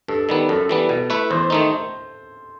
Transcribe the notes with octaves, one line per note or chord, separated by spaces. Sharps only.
G2 A4
D#3 G3 B3
F#2 A4
E3 G3 B3
B2
A3 E4 B4
E2 C5
D#3 A3 D#4